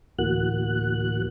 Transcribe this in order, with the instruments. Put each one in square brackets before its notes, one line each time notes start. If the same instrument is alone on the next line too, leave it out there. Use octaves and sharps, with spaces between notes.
[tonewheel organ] D2 A2 E3 A#3 F#4 F#6